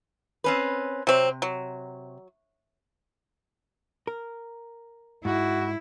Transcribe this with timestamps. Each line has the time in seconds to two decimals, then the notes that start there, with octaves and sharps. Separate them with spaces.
0.44 C4 C#4 B4
1.07 C3 F#3 C4
1.42 F#3
4.07 A#4
5.25 G#2 E4 F#4